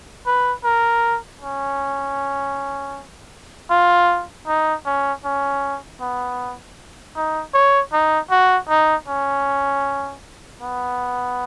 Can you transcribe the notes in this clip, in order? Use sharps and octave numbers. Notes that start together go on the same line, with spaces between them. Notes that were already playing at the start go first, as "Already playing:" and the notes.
B4
A#4
C#4
F4
D#4
C#4
C#4
B3
D#4
C#5
D#4
F#4
D#4
C#4
B3